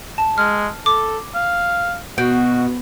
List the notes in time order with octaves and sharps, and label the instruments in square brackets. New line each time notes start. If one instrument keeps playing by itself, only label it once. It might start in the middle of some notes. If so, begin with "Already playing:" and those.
[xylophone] A5
[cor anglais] G#3 [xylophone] F6
[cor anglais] A4 [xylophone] D6
[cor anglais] F5
[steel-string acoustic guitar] B2 [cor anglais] F#4 [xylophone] G6 D7